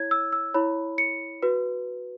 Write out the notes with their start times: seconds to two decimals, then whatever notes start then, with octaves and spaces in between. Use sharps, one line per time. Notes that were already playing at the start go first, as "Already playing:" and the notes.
Already playing: E4 C#5 G#6
0.11 E6
0.33 E6
0.54 E4 C#5 B5
0.98 C#7
1.43 F#4 B4